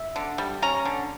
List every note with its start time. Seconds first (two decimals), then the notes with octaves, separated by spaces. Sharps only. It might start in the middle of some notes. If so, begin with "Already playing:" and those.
Already playing: E5
0.16 D3
0.38 G3
0.62 C#4 A#5
0.85 D3